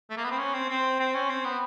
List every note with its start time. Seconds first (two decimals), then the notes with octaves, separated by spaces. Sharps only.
0.10 A3
0.17 A#3
0.24 B3
0.31 C4
0.38 C#4
0.54 C4
0.69 C4
0.99 C4
1.14 C#4
1.29 C4
1.45 B3